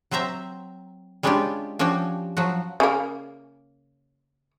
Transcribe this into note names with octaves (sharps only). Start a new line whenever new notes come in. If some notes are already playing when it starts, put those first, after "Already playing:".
F#3 C4 C5 E5 A#5
G3 G#3 C#4 D4 F4 G4
F3 C#4 D4 F#4 G4
F3 F#3 F#4
C#3 A#3